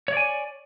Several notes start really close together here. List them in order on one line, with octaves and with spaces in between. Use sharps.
C#5 D5 G#5